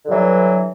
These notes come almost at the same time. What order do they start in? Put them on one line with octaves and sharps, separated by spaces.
D3 G2 F#3 E3